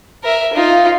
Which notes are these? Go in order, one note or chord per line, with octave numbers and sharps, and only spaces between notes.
A#4 E5
D#4 F4